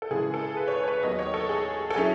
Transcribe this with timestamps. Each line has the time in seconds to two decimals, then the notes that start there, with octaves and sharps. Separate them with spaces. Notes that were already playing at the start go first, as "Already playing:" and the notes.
0.02 A4
0.10 C#3 E3 G#3 G#4
0.34 A4
0.57 B4
0.68 C#5
0.73 B4
0.83 C#5
0.88 B4
1.03 D#2 D#3 F#3 B3 D#5
1.19 C#5
1.34 A4
1.49 G#4
1.90 A4
1.95 F#3 C#4 E4 G#4